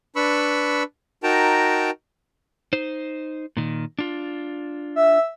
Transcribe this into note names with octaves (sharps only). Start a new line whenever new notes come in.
D4 B4 B5 C#6 E6
D#4 F#4 A#4 G5 A5 A#5
D#4 C5
A#2 D#3
D4 F4
E5